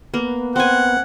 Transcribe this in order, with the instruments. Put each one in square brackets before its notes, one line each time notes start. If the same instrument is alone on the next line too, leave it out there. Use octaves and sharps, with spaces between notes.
[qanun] A#3 [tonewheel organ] B3
[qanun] C4 G#5 [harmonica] F#5